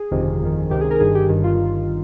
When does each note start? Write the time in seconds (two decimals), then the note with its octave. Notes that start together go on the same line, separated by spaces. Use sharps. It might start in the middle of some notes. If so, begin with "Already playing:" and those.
Already playing: G#4
0.11 G1 F2 C3 D#3
0.41 G1 F2 D#3
0.70 C#2 C3 D#3 G4
0.81 G#4
0.91 A#4
0.99 G1 G2 D#3 G#4
1.15 G4
1.29 G1 G2 D#3
1.44 F4